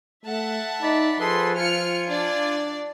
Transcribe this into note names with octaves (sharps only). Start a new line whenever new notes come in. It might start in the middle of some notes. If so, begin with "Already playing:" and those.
A3 E5 F#5 A5
D#4 D5 B5
F3 G#4 A4 B4 C6
F4 G#5 F6 C#7
D4 D5